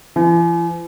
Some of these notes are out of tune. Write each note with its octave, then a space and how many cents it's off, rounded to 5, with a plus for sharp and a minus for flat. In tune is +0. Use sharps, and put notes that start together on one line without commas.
E3 +45